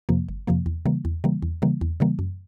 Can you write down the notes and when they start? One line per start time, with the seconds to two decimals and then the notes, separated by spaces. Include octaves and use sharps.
0.09 F2 C3 F3 A#3
0.29 G1
0.47 F2 C3 F3 A#3
0.66 E2
0.86 C#3 E3 G3 A#3
1.05 E2
1.24 C#3 E3 G3 A#3
1.42 E2
1.62 C#3 E3 G3 A#3
1.81 E2
2.00 C#3 E3 G3 A#3
2.19 F#2